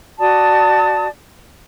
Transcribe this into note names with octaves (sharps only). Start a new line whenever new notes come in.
F#4 D5 A5 D#6